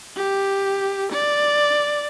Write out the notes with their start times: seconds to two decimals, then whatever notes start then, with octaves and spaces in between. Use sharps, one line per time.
0.17 G4
1.12 D5